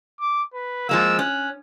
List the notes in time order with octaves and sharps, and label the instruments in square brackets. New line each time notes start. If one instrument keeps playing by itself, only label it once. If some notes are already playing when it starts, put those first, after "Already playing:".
[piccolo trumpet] D6
B4
[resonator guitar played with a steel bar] F3 G#3 A#3 [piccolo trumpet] E6
[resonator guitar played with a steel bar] C#4 [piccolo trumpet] F#6